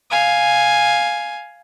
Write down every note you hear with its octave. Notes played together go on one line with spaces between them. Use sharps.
F5 G#5